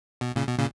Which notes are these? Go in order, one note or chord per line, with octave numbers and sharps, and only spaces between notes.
B2
A#2 C#3
B2
A#2 C#3